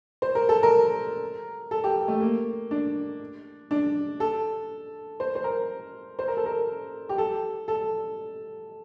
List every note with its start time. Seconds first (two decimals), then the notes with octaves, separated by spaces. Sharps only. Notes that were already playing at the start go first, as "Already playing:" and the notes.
0.22 C5
0.35 A#4
0.49 A4
0.63 A#4
1.71 A4
1.84 G4
2.08 A3
2.21 A#3
2.71 D4
3.71 D4
4.20 A4
5.20 C5
5.35 C5
5.44 A#4
6.19 C5
6.28 A#4
6.37 A4
6.46 A#4
7.09 G4
7.18 A4
7.68 A4